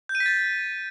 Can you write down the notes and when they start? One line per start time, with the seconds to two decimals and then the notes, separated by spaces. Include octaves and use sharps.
0.09 G6
0.15 D#7
0.20 B6
0.26 A6